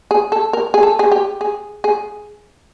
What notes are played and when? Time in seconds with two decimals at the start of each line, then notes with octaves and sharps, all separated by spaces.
0.11 G#4
0.32 A4
0.53 A#4
0.74 G#4
0.83 A4
0.99 G#4
1.12 G4
1.41 G#4
1.84 G#4